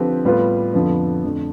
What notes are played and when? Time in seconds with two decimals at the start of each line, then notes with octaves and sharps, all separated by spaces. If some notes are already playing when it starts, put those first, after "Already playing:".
Already playing: D3 F3 C4 G4 B4
0.25 A2 G3 B3 F4 B4
0.74 F2 D3 F3 B3
1.24 F2 D3 A3